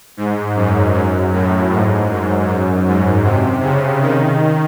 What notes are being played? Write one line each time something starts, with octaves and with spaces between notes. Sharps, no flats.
G#2
F#2
F#2
A2
G#2
F#2
F#2
G#2
C3
C#3
D#3